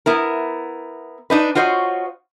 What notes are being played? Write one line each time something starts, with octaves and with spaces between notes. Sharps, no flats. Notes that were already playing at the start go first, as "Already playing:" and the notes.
B3 E4 A#4
D4 D#4 B4
F4 F#4 C5 C#5 D#5